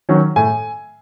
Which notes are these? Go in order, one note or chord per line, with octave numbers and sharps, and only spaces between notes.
D#3 F#3 C#4
A2 G#5